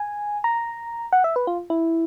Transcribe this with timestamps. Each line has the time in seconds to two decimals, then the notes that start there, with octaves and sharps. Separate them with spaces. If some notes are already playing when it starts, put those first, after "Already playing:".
Already playing: G#5
0.44 A#5
1.13 F#5
1.24 E5
1.36 B4
1.47 F4
1.70 E4